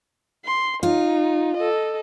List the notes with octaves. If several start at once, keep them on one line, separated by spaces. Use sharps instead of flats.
C6
D#4 F4
A4 D#5